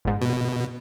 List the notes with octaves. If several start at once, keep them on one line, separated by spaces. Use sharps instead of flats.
G1 G#2
B2